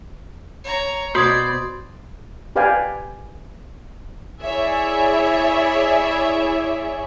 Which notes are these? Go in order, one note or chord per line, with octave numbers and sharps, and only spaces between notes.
C#5 A#5
B2 C5 D5 B5 C6 D#6 G#6
G4 B4 D5 F5 G5 G#5
E4 G#4 C#5 D5 E5